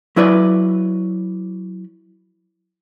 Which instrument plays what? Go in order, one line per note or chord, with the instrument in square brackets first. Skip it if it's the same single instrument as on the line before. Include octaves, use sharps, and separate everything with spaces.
[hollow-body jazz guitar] F#3 E4 B4 D5